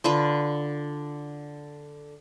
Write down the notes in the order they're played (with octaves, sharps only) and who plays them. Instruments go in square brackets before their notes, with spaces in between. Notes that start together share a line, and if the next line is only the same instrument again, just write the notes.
[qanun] D3 F4 B4